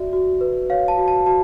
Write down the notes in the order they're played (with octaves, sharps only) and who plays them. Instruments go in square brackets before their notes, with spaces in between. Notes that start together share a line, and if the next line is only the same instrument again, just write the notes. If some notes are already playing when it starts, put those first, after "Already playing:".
Already playing: [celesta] F#4 D5 E5
F#4
B4
C#5 F5
A5
F#4
A5
F#4 A5